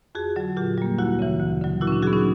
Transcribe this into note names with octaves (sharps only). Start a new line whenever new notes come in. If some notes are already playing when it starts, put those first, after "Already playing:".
F2 F#4 G#4
D3 F#3
A#2 F4 G4
G3 A#3
D2 E4 F#4
C#3 E3
D2
D3 F#3
A#2 E4 F#4
C#4
D4
F#3 B3 F#4 G#4
C#4 D#4